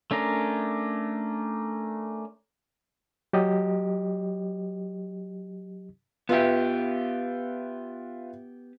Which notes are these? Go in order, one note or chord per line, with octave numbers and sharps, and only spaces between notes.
A3 C#4 D4 A#4
F#3 G4 D#5
B3 F4 G4 B4 E5